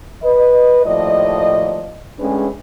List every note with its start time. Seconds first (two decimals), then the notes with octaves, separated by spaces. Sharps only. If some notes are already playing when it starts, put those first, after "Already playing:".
0.23 B4 D#5
0.85 D#2 A2 F3 D5 D#5
2.19 A2 G#3 C#4 D4 G#4 B4